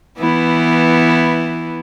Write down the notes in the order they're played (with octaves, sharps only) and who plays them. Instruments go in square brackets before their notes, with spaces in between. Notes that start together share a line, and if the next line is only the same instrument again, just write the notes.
[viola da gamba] E3 B3 E4